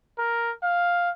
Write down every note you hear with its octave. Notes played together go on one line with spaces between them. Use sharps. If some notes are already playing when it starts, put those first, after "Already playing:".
A#4
F5